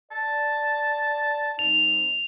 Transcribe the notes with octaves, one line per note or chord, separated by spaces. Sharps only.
D5 A5
G3 C4 D#4 F7